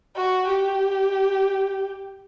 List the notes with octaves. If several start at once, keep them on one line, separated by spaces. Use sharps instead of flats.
F#4
G4